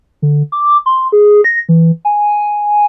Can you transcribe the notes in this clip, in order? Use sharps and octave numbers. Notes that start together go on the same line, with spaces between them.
D3
D6
C6
G#4
A#6
E3
G#5